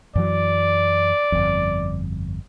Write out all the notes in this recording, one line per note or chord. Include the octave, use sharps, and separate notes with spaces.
F#2 E3 F#3 D5
G1 F2